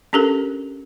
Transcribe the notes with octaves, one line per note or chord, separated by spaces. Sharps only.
C#4 D4 G4 A4 A#4